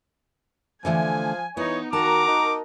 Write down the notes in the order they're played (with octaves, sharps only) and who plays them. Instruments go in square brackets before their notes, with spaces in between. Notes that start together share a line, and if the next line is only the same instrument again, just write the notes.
[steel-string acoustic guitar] D3 E3 A3 [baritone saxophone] F3 [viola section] G#5
[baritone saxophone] E3 [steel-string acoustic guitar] B3 [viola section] D#4 [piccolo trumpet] C#5
[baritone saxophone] D#3 [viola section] F#4 A#4 A#5 [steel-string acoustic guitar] A5 [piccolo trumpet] D6
[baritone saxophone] D#4